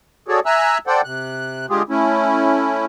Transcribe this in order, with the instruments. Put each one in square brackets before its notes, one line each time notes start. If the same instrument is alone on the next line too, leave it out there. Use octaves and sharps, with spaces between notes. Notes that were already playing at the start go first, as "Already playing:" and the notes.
[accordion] F#4 G#4 A4 C#5 D5
E5 G#5 A#5 E6 F#6
A4 C5 D5 F#5 G5
C3 F#6
D3 G#3 F4 G4 G#4
A3 C#4 E4